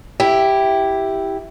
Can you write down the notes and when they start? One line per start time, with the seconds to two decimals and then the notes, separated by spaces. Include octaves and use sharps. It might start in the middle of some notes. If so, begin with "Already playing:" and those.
0.20 E4 G4